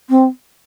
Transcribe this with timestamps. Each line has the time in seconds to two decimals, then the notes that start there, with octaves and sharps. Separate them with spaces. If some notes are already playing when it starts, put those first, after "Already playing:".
0.10 C4